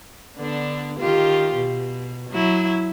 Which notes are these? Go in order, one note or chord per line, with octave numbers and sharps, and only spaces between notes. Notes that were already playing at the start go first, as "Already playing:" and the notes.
D3 B3 D4
D#3 F4 G4
B2
F#3 E4